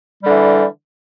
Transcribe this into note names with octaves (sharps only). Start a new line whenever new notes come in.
D3 E3 G3